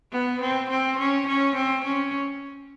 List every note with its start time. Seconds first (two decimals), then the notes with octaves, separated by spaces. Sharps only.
0.12 B3
0.41 C4
0.70 C4
0.98 C#4
1.27 C#4
1.55 C4
1.85 C#4